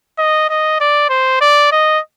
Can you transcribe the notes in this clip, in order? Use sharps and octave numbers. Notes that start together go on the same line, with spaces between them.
D#5
D#5
D5
C5
D5
D#5